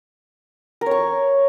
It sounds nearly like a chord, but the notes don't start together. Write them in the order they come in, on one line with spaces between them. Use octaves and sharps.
A#4 C#5 C#6